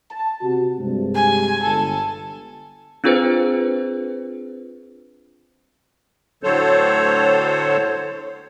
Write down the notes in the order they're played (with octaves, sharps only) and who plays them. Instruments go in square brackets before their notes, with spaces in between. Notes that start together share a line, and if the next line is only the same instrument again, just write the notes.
[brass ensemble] A5
C3 F#4
G2 C3 G#3
[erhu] G#5
[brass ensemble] G1 [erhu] A4
[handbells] C4 D4 F4 G#4 B4 C5
[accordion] A2 D3 F#3 A4 C5 C#5